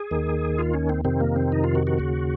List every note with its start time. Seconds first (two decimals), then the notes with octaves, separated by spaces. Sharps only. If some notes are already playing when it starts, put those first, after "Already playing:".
Already playing: G#4
0.11 D#2 D#3
0.58 F4
0.74 C#4
0.89 C4
1.05 F2 C3 D#3 C4
1.20 A#3
1.36 C4
1.52 D#4
1.64 F4
1.75 F#4
1.87 F#4
1.99 D#2 C#3